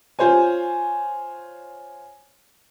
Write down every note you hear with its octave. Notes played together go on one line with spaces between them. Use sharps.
F4 C5 C#5 G#5